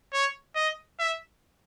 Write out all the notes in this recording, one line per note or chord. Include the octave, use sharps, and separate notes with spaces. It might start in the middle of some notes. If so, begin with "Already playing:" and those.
C#5
D#5
E5